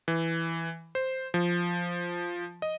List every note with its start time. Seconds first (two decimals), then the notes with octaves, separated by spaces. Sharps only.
0.08 E3
0.95 C5
1.34 F3
2.62 D#5